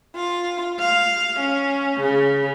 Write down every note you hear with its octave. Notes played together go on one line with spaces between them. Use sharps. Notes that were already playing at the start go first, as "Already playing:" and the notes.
F4
F5
C#4
C#3